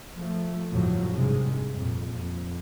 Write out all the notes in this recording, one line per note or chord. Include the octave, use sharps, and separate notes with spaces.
F3 A3
G1 F2 A2 C#3 F3 F#3
G#1 G2 C3 D#3 G#3
F2 A#2
F2